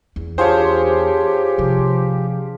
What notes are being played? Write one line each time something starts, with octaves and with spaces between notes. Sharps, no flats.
E2
D4 F4 G4 G#4 C5 C#5
C3 F3